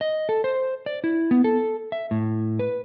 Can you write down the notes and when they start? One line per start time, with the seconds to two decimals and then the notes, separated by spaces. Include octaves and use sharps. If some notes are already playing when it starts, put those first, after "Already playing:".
0.01 D#5
0.29 A4
0.44 C5
0.86 D5
1.04 E4
1.31 B3
1.44 A4
1.92 E5
2.11 A2
2.59 B4